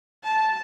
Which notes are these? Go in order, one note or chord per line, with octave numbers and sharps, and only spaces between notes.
A5